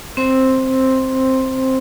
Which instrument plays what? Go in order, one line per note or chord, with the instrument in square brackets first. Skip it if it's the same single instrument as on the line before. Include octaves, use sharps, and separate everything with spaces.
[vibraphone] C4 C5 C6